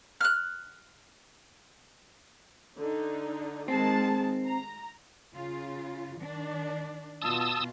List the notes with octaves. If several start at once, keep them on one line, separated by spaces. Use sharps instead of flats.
F6 F#6
D3 D#4
D#3 G#3 C4 A5
A#5
C#3 F4
D#3 D4
B2 F4 A5 D#6 E6